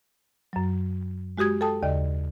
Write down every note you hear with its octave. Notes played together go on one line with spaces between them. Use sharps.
F#2 F#3
G#3 F#4 G4 D#6 G#6
A4 G5 A5 D#6
D#2 C#3 D5 D#5